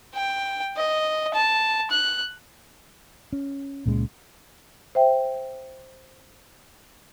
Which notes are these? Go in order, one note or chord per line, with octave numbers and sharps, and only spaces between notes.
G5
D#5
A5
F#6
C#4
C#2 A#2 C#3 G#3
C5 E5 G5